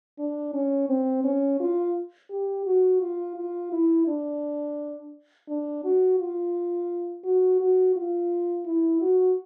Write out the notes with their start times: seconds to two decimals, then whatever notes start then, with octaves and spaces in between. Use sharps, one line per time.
0.19 D4
0.54 C#4
0.89 C4
1.24 C#4
1.60 F4
2.31 G4
2.66 F#4
3.01 F4
3.36 F4
3.72 E4
4.08 D4
5.48 D4
5.84 F#4
6.19 F4
7.25 F#4
7.61 F#4
7.96 F4
8.66 E4
9.02 F#4